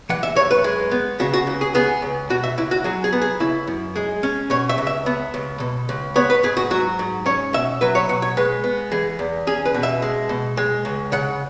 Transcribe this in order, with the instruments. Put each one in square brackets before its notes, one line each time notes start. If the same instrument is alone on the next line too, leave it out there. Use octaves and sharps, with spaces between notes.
[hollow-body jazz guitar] E3 F#5
E5
F#2 C#5
B4
G#3
B3
C#3 F#4
F#4
C#2
G#4
B3 G#4
C#2
B2 F#4
E5
C#2 E4
F#4
F#3 G#4
G#4
B3
G#4
C#3 E4
F#2
G#3 G#4
C#4
B2 C#5
E5
C#2
E5
B3
C#2
B2
C#2
B3 C#5
B4
G#2 G#4
F#4
F#3 F#4
G#2
C#4 C#5
B2 E5
F#3 B4
C#5
B2 F#5
C#5
G#3 B4
B3
E3 G#4
E2
C#4 G#4
B4
B2
E5
G#3
B2
G#3
C#2
C#3 F#5